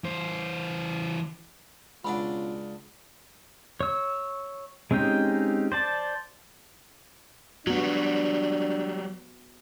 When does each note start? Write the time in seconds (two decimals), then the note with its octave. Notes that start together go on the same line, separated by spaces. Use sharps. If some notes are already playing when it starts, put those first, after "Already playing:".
0.04 E3 C5
2.05 C#2 B2 C#4 D4 F4 D5 F#5 B5
3.81 C#5 E6
4.91 G#3 C4 C#4 D#4 G4
5.72 C5 D5 A5
7.67 F#3 G3 B3 D4 F#4